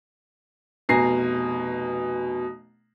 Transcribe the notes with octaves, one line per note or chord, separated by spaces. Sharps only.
F1 B2 G#5 A#5 A#6 C7